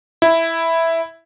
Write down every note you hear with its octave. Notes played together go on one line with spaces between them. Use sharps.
E4